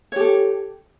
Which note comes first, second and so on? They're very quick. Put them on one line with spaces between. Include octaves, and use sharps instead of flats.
C#5 G4 A4